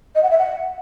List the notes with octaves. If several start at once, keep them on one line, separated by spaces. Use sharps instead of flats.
D#5
F#5
E5
F#5